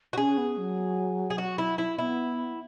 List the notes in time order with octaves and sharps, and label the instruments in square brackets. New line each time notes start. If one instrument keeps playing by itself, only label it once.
[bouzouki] F#4
[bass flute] C#4 [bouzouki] G#4
[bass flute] B3
F#3
[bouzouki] G#4
F#4
E4
E4
[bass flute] B3 [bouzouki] E4